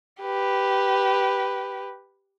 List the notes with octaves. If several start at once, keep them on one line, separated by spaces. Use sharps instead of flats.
G4 B4